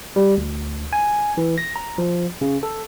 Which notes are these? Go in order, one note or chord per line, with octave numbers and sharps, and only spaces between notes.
G3
D2
G#5
E3
A#6
A#5
F3
C#3
A4